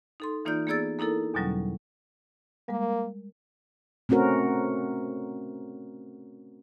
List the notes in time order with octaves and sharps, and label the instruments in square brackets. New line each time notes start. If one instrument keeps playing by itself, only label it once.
[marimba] D#4 A4 C6
E3 A#3 D#4 F4 D5 G6
A#3 B3 G#4 D5 E6 A6
A#3 D#4 E4 A4 A#4
E2 B2 D3 F#3 G3 C#4
[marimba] G3 G#3 A#4 [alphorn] A#3
[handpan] A3 C4 C#4 F#4 A#4